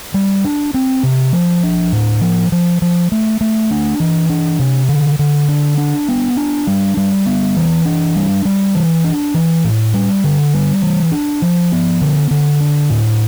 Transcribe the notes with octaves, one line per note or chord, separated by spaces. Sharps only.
G3
D4
C4
C3
F3
D4
A2
F3
F3
F3
A3
A3
D4
E3
D4
C3
D3
D3
D4
D4
B3
D4
G3
G3
B3
E3
D4
G3
G3
E3
D4
E3
A2
G3
D3
G3
E3
D4
F3
B3
D3
D3
D4
A2